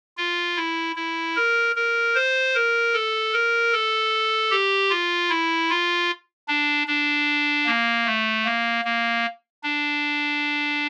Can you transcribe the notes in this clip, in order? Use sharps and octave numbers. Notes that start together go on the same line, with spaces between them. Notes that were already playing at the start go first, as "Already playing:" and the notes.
F4
E4
E4
A#4
A#4
C5
A#4
A4
A#4
A4
G4
F4
E4
F4
D4
D4
A#3
A3
A#3
A#3
D4